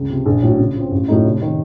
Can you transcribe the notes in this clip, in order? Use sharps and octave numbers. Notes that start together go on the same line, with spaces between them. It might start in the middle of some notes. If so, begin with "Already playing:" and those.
Already playing: C#2
C3 F3
A#1
A2 F#3
C#3
F3
C4
A1
A2 F#3 A3 D#4
F1
D#3